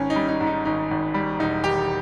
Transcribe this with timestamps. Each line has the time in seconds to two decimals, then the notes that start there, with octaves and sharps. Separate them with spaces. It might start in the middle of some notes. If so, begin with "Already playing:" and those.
Already playing: G#1 C#4
0.10 D#4
0.16 G3
0.28 D#4
0.41 G#2
0.47 D#4
0.65 G#1 D#4
0.91 G#1
1.14 G3
1.40 E1 D#4
1.64 D#3 G4